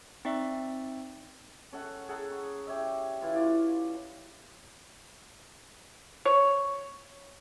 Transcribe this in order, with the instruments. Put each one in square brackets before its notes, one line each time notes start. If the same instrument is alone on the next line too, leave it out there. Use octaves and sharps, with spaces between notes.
[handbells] C4 D#4 D5 E5
[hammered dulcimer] C#4 A4 F#5
G#4 A4 F#5 A#5
C#6
G4 C#5 D5 E5
E3 E4 F4
F4 C#5 D5
[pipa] C#5